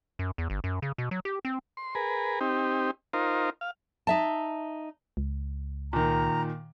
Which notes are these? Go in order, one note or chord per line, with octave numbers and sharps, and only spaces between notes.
F#2
E2
G1
F#2
C#3
B2
F#3
G4
C4
C6
G#4 A#4 B4
C4 D#4 G4
D#4 F4 A#4 C5
F5
D#4 E5 A5
C#2
A#2 D#3 A#5